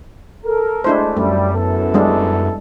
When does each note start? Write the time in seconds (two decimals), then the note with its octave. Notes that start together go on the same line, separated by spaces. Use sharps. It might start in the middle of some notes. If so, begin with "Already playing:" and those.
0.44 A4 A#4
0.84 G#3 A3 D4 E4 C5
1.17 F#2 G3 A3
1.54 B3 E4 A4
1.94 G3 G#3 D4